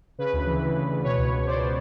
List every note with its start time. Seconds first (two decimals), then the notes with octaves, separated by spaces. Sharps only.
0.18 C#3 B4
0.33 D2
0.47 E3
0.61 D2
0.76 C#3
0.90 D2
1.04 B2 B4 C#5
1.18 C#2
1.32 C#2
1.46 B2 C5 D5
1.60 B2